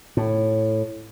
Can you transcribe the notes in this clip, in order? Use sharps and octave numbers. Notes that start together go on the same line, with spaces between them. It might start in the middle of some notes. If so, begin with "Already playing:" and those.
A2